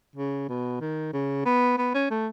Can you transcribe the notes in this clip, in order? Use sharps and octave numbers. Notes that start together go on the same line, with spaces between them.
C#3
B2
D#3
C#3
B3
B3
C#4
A3